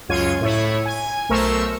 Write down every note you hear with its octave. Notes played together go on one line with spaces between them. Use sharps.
C#2 F#2 F4 C#5 G#6 D#7
A2 E4 C#5
G#5
B1 A3 A#4 C5 C#6 E6